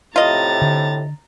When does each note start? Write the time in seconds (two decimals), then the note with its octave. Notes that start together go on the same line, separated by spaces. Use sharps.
0.16 A2 C3 F4 D#5 A#5 A6
0.61 D3